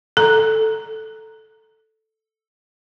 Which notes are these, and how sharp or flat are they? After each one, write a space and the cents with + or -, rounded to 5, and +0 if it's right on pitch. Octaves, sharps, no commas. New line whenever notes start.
A4 +0 A#5 +0